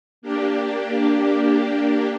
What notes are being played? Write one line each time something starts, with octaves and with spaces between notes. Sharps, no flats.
A#3 D4 G4